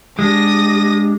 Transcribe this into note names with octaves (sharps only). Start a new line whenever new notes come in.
G#3 D4 G4 D#6 A#6